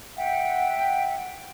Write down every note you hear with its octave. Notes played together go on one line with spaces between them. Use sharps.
E5 F#5 G5